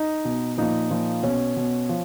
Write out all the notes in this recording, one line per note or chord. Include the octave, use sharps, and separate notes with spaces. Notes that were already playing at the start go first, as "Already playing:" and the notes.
Already playing: D#4
B2
A#2 F3 D#4
A#2 F3
B2 C#4
B2
F3